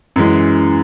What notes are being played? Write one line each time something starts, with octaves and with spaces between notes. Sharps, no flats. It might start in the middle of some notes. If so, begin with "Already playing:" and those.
F#2 E3 G#3